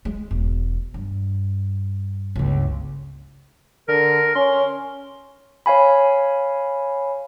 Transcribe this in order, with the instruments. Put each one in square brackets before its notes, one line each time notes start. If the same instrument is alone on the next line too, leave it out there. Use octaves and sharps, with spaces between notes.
[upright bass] G#3
E1
G2
G1 C#2
[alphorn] D3 [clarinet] A#4
[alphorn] C#4 [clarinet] C6
[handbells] C#5 F5 G#5 B5